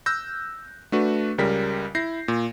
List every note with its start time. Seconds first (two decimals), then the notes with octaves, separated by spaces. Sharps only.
0.06 E6 F#6 G6 A#6
0.92 A3 D4 F#4 B4
1.38 C#2 C#3 G3 A#4 B6
1.95 E4 G6 A#6 C7
2.28 A#2